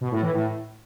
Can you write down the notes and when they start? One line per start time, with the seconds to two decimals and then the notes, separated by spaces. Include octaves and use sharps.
0.01 B2
0.11 A2
0.22 E3
0.32 A2